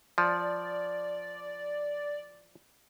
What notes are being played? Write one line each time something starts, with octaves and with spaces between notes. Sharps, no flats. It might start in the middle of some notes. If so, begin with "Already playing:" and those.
F3 D5